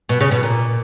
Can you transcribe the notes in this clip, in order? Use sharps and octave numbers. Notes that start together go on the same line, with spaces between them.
B2
C#3
B2
A#2